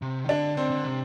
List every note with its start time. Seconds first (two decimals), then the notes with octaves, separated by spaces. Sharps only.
0.02 C3
0.24 D#3
0.29 D3 D4
0.57 D3 C4
0.70 D3
0.84 C3